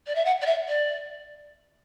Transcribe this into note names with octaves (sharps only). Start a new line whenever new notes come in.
D5
E5
F#5
D5
E5
D5